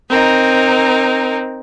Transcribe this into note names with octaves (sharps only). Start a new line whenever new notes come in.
C4 D#4 A#4